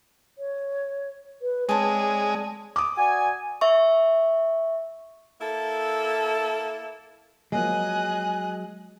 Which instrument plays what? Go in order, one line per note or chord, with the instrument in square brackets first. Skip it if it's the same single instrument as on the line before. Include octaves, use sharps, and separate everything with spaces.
[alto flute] C#5
B4
[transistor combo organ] G#3 [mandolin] C4 D4 [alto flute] C#5
[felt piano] D6 D#6
[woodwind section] F#4 D5 G#5
[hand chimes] E5 C#6
[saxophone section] A#3 E4 A4
[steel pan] F3 A#3 [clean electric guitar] F#3 G#3 [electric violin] D#5 F#6 [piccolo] G#5